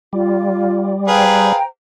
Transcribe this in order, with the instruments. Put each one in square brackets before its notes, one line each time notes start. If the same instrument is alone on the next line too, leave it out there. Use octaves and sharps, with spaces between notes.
[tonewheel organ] G3 [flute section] F4
[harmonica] G#4 B4 F5 [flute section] C5 G5 A#5